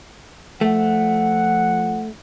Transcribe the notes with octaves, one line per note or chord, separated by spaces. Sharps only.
F3 A3 F#5